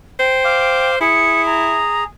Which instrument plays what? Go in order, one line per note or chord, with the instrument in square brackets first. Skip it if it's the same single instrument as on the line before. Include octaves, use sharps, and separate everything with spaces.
[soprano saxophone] C5 [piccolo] G5
[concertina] F5 D6
[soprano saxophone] E4 [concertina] G#4 [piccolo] C#7
[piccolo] A#5